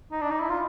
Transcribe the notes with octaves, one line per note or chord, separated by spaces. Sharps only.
D#4
D4
D#4
E4
F4